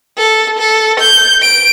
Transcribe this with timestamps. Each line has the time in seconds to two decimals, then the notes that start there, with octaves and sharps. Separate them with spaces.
0.18 A4
0.59 A4
1.00 G6
1.42 D7